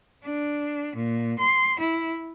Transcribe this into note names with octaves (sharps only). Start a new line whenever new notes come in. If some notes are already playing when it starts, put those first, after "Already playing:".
D4
A#2
C6
E4